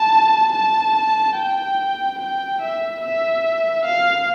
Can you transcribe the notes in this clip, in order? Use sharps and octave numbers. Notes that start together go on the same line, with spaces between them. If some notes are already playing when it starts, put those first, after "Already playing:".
Already playing: A5
A5
G5
G5
E5
E5
F5